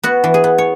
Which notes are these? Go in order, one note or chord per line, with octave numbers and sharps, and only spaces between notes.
B3 F#4
E3
G#4
B3
C#5